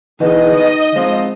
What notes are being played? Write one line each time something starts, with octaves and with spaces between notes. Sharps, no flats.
B2 D#3 E3 G#4 D#5
D#3 D#5
F3 G#3 C4